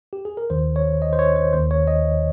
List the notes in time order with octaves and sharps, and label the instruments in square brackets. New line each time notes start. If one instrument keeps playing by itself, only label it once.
[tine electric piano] G4
G#4
A#4
D#2 D#3 C5
C#5
D#5
C5
C#5
C5
D#2 D#3 C5
C#5
D#5